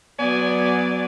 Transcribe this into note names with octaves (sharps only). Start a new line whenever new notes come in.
F#3 B3 D5 G#5